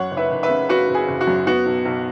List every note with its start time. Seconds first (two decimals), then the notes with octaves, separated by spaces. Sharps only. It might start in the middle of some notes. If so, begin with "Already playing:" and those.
Already playing: F#2 C#5 F#5
0.11 F#1
0.17 B4 E5
0.30 F#1
0.43 B4 E5
0.49 C#3
0.69 C#3 F#4 B4
0.89 F#1
0.95 G#4
1.08 F#1
1.21 F#4
1.27 F#2
1.47 B3 F#4
1.66 B1
1.85 B1